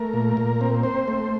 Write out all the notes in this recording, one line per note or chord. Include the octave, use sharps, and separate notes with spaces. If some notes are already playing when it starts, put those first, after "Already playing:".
Already playing: A3 A#4
A#2
A#2
C4
C4 C5
A3